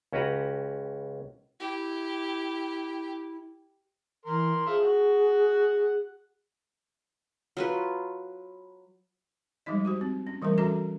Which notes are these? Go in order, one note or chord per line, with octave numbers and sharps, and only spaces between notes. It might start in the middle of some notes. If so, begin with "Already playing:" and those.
C#2 C#4 F#4 G4 B4 A#5
E4 G4
E3 A#4 C6
F3 G#4 E5
F#4 F#5
F#3 F4 B4
F3 G3 G#3 D#4 D#5
F#4 G4 C5
C4
C#4
E3 G3 A3 C#4 A#4
C#4 F#4 A4 E5 A#5